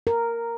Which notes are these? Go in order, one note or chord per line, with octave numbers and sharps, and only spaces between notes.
A#4